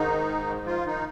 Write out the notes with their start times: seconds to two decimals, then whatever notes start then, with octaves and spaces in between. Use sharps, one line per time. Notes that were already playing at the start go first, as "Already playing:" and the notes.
Already playing: G#2 D#3 D#4
0.66 F3 F4
0.86 D#3 D#4